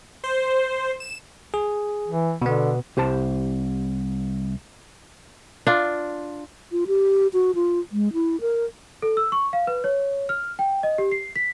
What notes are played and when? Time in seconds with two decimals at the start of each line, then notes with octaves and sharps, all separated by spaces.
0.24 C5
1.00 E7
1.54 G#4
2.07 E3
2.42 B2 D3 B3
2.97 C2 G4 C5 A5
5.67 D4 F4
6.72 F4
6.87 G4
7.33 F#4
7.55 F4
7.92 G#3
8.13 E4
8.41 A#4
9.02 A4
9.17 E6
9.32 C#6
9.53 F5
9.67 B4
9.84 C#5
10.29 F6
10.59 G5
10.83 D#5
10.98 G4
11.12 C7
11.36 B6